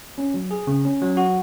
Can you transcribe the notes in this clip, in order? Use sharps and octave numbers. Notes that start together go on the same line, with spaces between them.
C#4
F#3
G#4
C#3
C#4
F#3
F#4